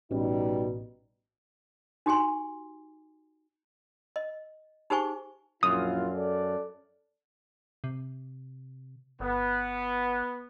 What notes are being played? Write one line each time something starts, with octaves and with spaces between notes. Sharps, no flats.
A1 B2 G3 C#4 D#4
D#4 F#4 G4 G#5 C6
D#5
D#4 G4 G#4 C5 G#5 C#6
A#1 F#2 E4 F4 D#6
A4 D5
C3
G1 B3